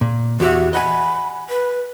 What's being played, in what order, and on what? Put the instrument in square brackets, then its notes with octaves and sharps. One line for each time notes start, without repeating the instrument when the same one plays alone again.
[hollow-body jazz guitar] A#2
[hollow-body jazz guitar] E2 G4 E5 [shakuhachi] F#4
[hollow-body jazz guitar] D#5 F#5 G#5 [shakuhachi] B5
[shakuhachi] B4